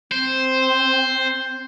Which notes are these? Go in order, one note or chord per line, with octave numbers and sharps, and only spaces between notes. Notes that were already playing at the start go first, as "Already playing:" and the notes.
C4 C5